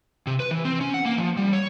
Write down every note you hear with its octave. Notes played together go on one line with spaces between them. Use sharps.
C3
B4
E3
C4
C#4
F#5
A#3
F3
G3
C#5